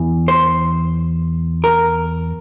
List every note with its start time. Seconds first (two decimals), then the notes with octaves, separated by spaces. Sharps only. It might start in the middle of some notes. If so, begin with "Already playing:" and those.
Already playing: E2 E3
0.28 C5
1.64 A#4